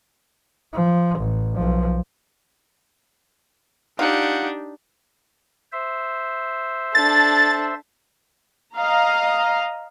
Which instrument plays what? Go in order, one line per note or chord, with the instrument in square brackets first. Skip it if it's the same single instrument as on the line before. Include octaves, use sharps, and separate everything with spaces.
[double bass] F3
A1
B1 F3
[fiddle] D4 [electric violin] D#4 G4 [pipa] F4 [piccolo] F#5
[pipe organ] C5 E5
[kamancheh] D4 A4 [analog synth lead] A6
[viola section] D#5 F5 A#5